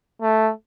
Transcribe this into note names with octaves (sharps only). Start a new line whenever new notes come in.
A3